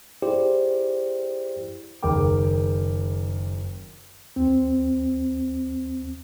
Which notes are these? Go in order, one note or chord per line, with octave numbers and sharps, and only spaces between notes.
E4 G4 G#4 C5 D5
F#1 D#3 G#4 A#4 G5 D6
D#2 C4